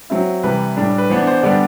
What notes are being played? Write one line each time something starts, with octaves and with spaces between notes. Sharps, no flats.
F#3 C4 E4
C3 E3 G3 B4
A2 G3 D4
B4
E3 B3 D4 C5
C5
D3 G3 B3 D4 D5